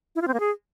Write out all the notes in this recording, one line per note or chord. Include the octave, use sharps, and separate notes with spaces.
E4
F4
C4
A#3
G#4